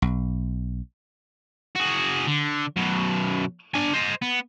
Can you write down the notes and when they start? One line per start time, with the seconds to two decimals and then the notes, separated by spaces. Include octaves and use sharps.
0.02 B1
1.76 F#4 G#4
2.27 D3
2.76 F#2 B2
3.74 D4 G#5
3.93 C5 D#5
4.22 B3